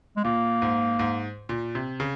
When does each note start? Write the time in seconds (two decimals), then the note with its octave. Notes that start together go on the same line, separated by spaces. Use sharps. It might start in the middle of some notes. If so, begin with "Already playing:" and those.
0.17 G#3
0.24 A#2 A#3
0.62 G#2
0.99 G#2
1.49 A#2
1.75 C3
2.00 C#3